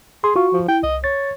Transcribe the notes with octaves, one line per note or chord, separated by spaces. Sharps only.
G#4 C6
F4 F#4 C#6
F3
E4 G5
C2 D#5
C#5 A6